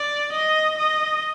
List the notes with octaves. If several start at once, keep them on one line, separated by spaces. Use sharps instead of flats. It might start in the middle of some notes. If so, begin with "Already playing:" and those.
Already playing: D5
D#5
D#5